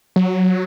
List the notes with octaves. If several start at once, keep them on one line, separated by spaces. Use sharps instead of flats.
F#3